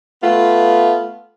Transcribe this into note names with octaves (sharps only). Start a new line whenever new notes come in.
A3 B3 F4